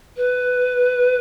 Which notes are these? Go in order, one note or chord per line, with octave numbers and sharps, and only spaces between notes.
B4